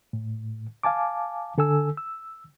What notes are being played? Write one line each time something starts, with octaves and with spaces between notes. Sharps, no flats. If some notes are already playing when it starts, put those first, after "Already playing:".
A2
F5 G#5 A5 D6
D3 A4 G#5 E6
E6